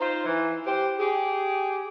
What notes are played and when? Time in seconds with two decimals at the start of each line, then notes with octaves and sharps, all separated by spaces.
0.01 D#4 F4 C5
0.25 E3
0.65 G4 C5
0.99 G4 G#4